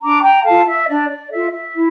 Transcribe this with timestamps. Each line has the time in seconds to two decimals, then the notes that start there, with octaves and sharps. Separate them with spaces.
0.02 D4 A#5 D6
0.23 G5 A#5
0.44 F4 A4 F5 A5
0.66 E5
0.87 D4 D5
1.08 D5
1.30 F4 A4 E5
1.51 E5
1.72 E4